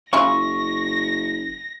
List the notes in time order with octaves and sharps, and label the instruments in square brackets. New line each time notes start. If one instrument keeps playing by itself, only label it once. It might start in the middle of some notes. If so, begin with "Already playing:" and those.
[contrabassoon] F#1 [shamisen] C#4 E4 F4 [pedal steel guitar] C#6 [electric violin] A#6